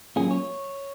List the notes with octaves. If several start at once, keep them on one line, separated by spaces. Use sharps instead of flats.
F#3 A#3 C#4 F4 G#4
C#5